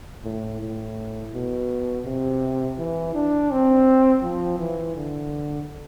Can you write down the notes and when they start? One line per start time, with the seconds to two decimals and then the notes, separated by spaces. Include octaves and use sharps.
0.25 A2
0.61 A2
1.34 B2
2.06 C3
2.79 E3
3.15 D4
3.51 C4
4.23 F3
4.59 E3
4.96 D3